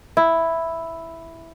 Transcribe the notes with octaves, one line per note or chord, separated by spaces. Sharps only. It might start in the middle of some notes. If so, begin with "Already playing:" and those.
E4